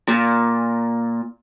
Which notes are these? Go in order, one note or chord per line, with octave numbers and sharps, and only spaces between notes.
A#2